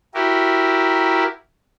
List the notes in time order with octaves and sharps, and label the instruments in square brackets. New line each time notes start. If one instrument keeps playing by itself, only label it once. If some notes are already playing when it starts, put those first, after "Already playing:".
[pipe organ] E4 F#4 G4 A#4